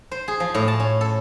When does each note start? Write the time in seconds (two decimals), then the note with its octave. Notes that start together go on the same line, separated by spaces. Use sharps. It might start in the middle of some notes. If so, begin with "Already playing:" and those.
0.11 C5
0.28 G#4
0.40 F3
0.54 A2
0.68 A5
0.80 C#4
1.01 A4